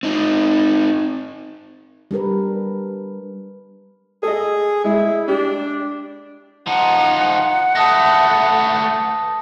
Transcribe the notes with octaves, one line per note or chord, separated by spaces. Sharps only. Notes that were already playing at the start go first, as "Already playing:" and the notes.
C4 D#4
G3 D4 A#4 B4
G#4 A4 D#5
G#3 E4
D4 G4
F3 D#4 F#5
A3 B3 A5 D#6 A#6